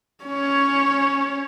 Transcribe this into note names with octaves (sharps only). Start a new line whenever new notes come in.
C#4 C#5